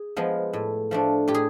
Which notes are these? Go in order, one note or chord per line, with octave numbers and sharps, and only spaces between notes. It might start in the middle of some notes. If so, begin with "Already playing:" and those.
Already playing: G#4
F3 G#3 B3
A2
F3 A3 D4
A2 G4
G#4